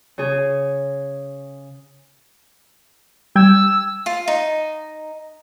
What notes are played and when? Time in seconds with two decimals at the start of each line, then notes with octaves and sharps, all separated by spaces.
0.18 C#3 G#4
3.36 G3 G5 E6 G#6
4.06 F4
4.28 D#4